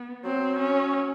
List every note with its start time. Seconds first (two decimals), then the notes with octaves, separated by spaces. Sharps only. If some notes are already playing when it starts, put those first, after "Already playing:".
Already playing: B3
0.24 F#3 C4
0.59 C#4